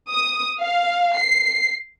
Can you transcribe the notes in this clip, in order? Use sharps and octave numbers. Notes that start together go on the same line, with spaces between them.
D#6
F5
C7